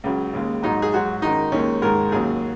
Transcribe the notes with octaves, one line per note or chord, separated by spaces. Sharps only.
C#2 C#3 F#3
D#2 C#3 G#3
G#2 F#3 D#4
G#4
G#2 F#3 F#4
F#2 D#3 G#3 D#4
D#2 D#3 G#3 C#4
G#2 D#3 G#3 A#4
D#2 C#3 F#3 G#4